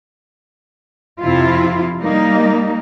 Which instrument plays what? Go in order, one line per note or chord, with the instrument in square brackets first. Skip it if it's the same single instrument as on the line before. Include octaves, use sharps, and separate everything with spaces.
[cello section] F2 C3 E4 F4
G3 A#3 D#4